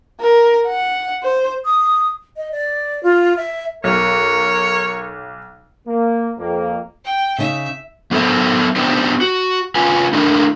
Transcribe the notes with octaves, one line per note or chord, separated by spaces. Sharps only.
A#4
F#5
C5
D#6
D#5
D5
F4
E5
B1 A#4 C#5
A#3
F2 A#3
G5
C#3 D#4 E5
F#3 B3 A4 C5 E5
B3 C4 D4 E4 G4 C5
F#4
C#4 F4 B4 G#5
A3 D4 E4 A#4